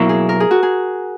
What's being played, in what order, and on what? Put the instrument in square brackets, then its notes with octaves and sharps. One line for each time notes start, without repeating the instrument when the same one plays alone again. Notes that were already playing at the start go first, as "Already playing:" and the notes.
Already playing: [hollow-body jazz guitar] B2 F#3 A#3 E4 [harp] A#4
[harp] G#4
A#4
G#4
F#4
G#4